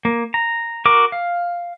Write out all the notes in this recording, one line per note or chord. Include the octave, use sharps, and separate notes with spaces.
A#3
A#5
F#4 A#4 D6
F5